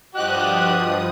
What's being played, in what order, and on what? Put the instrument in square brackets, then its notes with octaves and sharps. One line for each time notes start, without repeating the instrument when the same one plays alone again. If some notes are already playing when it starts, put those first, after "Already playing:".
[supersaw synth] G2 F3 D#6 [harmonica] F#4 G4 [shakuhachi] D#5 [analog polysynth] F#6